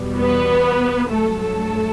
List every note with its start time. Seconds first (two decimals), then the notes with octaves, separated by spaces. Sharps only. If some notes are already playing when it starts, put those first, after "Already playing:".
Already playing: E2 B2 G3
0.19 B3 B4
1.10 G2 F#3 A3 A4
1.41 A3 A4